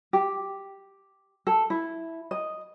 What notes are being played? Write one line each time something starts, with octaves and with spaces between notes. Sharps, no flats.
G4
A4
E4
D#5